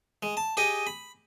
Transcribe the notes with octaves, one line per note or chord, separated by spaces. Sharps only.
G#3
A5
G4 G#4 D#5
B5